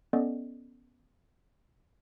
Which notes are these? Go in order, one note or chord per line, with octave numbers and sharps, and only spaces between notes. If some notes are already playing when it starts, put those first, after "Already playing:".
B3 C#4 A4 D5 D#5